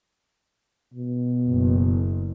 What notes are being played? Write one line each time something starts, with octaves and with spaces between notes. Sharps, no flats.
B2
F#1